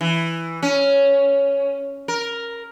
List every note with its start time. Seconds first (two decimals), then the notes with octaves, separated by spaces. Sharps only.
0.01 E3
0.62 C#4
2.08 A#4